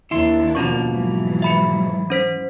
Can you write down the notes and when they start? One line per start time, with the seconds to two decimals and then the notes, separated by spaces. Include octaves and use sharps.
0.11 D#2 D4 E4 C6
0.55 B2 F3 A#3 C#4 C#6
0.88 G#2 E3 F#3
1.42 E5 B5 C#7
2.10 C#4 C5 B6